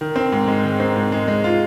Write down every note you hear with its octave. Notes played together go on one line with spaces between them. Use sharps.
D#3
C4
G#2
G#3
D#3
C4
G#2
G#3
G#3
F4